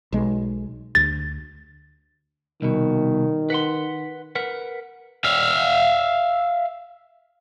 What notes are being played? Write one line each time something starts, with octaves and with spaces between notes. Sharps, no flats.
B1 G#3
D2 A6
C2 B2 D#3
B4 F#5 C6
A#4 B4 F#5
E5 F5